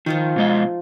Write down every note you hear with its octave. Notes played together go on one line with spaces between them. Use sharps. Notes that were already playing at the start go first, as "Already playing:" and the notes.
D#3 F3 D#4 F4
B2 G#3 D#5